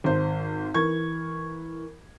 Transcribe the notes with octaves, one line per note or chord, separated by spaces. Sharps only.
G#1 C5
E3 A#4 C#6 G#6